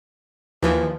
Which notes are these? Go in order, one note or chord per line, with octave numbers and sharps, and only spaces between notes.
D#2 E3 F3